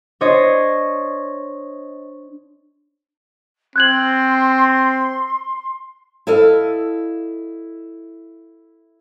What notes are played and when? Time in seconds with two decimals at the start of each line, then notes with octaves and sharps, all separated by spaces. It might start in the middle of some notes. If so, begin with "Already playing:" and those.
0.21 D4 C5 C#5 D#5
3.76 C4 C6 F#6 G#6 F#7
6.27 E4 A4 D#5 F5